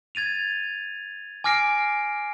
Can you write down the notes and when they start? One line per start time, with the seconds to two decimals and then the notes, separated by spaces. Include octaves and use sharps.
0.15 G#6 A6 D#7 F7
1.44 G#5 D6 F6 A#6 C7 D7